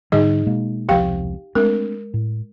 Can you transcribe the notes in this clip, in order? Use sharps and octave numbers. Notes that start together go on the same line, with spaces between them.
G#2 D3 G3 D#4 G#4 D#5
B2 G#3 A#3
E1 C2 F3 G4 F5 G5
G#3 A3 C4 D4 A#4
A2